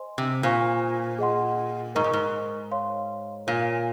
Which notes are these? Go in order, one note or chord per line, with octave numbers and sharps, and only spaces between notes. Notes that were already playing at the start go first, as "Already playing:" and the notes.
Already playing: C5 D#5 G#5 C6
C3
A#2 F4 C5 F5 G#5 C#6
G#4 D#5 F#5 C6
G#2 A#4 D#5 A#5 C#6
A#2
G#2
C#5 F5 C6
A#2 A#4 C#5 F5 G#5